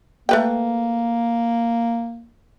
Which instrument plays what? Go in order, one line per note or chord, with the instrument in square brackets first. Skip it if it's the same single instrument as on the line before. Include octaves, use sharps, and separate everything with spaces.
[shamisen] A3 B4 G5 [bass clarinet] A#3